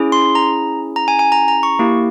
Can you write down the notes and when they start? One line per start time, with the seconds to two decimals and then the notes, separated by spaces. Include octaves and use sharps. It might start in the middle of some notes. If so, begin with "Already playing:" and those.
Already playing: C#4 E4 G#4
0.12 C6
0.35 A#5
0.96 A#5
1.08 G#5
1.19 G#5
1.32 A#5
1.48 A#5
1.63 C#6
1.79 A#3 E4 G4